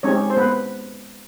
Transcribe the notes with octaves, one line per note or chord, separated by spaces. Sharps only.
G#3 C4 C#4 D#4 G4 C#5
C5
B3 B4